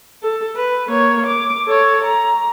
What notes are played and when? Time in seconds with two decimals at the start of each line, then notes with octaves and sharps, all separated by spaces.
0.23 A4
0.56 B4
0.88 A#3 C#5
1.26 D6
1.67 A4 C#5
2.04 A#5